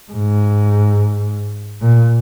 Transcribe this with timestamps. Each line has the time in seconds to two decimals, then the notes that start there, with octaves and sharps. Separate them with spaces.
0.12 G#2
1.81 A#2